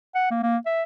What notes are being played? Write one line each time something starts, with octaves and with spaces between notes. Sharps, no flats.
F#5
A#3
A#3
E5